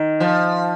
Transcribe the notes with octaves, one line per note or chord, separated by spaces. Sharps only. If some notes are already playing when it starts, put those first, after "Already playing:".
Already playing: D#3
F3